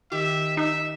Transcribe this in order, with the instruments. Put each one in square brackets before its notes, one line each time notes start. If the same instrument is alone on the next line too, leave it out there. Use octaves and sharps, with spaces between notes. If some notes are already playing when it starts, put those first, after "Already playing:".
[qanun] D#3 G4 D6 [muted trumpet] E5
[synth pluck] D#4 [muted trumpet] E5